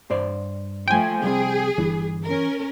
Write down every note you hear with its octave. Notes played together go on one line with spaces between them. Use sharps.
G2 C5 D5
F3 A3 G5 G#5
C2 G3 C4 G#4
G1 E3
C#4 A#4